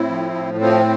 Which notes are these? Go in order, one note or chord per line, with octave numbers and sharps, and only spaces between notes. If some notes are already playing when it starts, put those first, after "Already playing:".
Already playing: A2 C4 E4
F3
A2
F3 C4